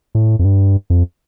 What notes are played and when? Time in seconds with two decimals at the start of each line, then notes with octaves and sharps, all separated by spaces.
0.15 A2
0.39 F2
0.45 G2
0.90 F2